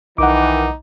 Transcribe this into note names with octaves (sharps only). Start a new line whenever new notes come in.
B1 D#3 E3 D#4 F#5 D6